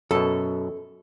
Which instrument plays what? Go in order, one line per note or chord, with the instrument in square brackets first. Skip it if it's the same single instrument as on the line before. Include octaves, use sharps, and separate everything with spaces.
[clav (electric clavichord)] F#2 B2 [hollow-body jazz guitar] A4